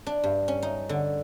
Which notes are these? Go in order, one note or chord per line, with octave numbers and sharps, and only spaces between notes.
D4
G2
C#4
D#4
D3